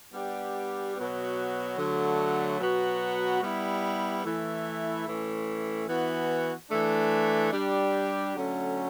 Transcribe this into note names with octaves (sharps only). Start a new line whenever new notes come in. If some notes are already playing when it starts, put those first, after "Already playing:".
G3 B3 D4 G4
B2 F#3 B3 F#4
D3 F#3 A3
B2 F#3 B3 F#4
G3 B3 E4
E3 A3 E4
A2 E3 A3 C#4
E3 B3 F#4
E3 A3 D4
G3 D4 G4
D3 F#3 A3 C#4